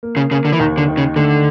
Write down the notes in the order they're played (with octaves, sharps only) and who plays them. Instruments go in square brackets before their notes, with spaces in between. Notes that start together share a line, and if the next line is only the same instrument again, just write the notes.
[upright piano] A#3
[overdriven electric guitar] C#3
[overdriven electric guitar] C#3 [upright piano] A#3
[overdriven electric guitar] D3
E3
[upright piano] D#2 [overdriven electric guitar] D#3
[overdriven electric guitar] D3
[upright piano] D#3
[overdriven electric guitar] C#3
[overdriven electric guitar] D3 [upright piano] A3